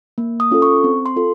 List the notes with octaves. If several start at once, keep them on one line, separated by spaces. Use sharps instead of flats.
A#3
D#6
C#4 F4 A4
C#6
C4
C6
F4 A4